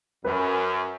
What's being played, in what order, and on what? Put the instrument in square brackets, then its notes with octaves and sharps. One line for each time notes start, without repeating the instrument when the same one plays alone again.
[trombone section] F#2 [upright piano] B4